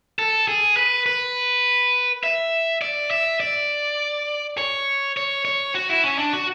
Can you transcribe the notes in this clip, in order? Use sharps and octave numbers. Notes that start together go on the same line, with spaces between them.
A4
G#4
B4
B4
E5
D5
E5
D5
C#5
C#5
C#5
F#4
E4
C#4
D4
F#4